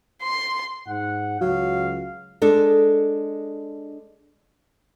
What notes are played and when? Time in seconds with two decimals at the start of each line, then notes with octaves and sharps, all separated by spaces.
0.23 C6
0.88 G#2 F#5
1.41 C#2 F#3 F5
2.42 G#3 D4 A4